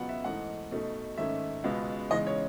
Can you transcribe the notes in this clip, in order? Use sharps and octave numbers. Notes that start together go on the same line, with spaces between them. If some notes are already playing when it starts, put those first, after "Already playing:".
Already playing: C#2 B2 F#3 B3 F#5
E5
G#2 E3 A3 D#4 F#5
B2 A3 D#4
G#2 D#3 A3 C#4 E5
C#2 B2 G#3 B3
E2 C#3 G#3 D#4 D#5
C#5